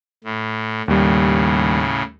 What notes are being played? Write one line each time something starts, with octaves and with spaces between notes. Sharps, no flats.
A2
D#2 A2 C#3 G3